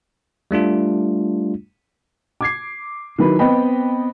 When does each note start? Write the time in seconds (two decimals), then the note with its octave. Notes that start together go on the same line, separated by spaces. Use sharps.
0.51 G3 A3 D4 F4
2.41 D6 G#6 C7
3.18 D#3 F#3 E4 B4
3.39 B3 C4 B4 D#5 G5 B5